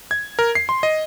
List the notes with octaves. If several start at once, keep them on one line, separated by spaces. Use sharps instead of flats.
G#6
A#4
C7
C6
D#5